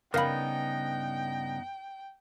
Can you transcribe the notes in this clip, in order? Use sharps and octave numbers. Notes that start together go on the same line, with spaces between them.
G2 C#3 B3 D#4 A#4 F5 G5 B5